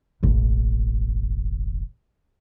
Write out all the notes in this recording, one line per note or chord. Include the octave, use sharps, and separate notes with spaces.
E1 A1